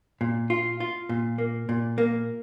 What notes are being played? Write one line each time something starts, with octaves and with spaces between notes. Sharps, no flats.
A#2
F4
F4
A#2
A#3
A#2
A#3